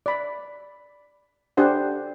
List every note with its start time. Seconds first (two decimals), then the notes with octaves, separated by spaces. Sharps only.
0.06 D5 B5
1.57 D4 G4 C5 F#5